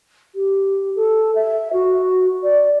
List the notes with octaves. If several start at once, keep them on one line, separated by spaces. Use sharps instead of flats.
G4
A4
E5
F#4
D5